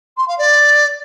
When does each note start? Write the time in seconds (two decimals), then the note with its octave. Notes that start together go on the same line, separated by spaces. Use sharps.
0.17 C6
0.27 F5
0.38 D5